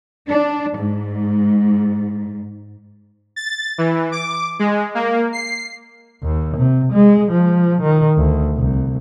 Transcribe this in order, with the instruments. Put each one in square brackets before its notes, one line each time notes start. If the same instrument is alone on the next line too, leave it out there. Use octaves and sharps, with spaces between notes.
[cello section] D4
G#2
[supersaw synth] A6
E3
D6
G#3
A#3
C7
[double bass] D#2
C3
G#3
F3
D#3
D2
C2